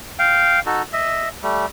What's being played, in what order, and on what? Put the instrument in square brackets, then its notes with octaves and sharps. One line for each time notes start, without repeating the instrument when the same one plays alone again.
[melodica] F5 G5
D#4 F#4 A4
D#5 E5
G3 A3